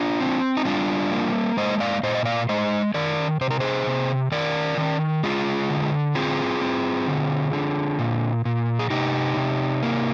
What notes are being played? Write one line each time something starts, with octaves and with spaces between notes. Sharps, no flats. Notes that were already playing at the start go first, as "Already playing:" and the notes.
Already playing: D4 F4
C4
D#4
G3 D4 F4
A#3
G#3 C5 D#5
D5 F5
A#2 C5 D#5
D#5
D5 F5
G#3 C5 D#5
D#3 A#4 D5
C3 C5
A#4
G#4 C5
C3
D#3 A#4 D5
D#3
G#3 F4 G#4
D3
C4 F4 G#4
C4
D3
D3
A#2
A#2
G#4
C3 D#4 G4
C3
A#3